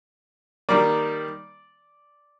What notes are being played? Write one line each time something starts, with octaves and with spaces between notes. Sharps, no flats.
D#3 G3 A#3 D5